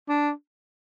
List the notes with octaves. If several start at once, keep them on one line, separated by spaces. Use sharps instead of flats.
D4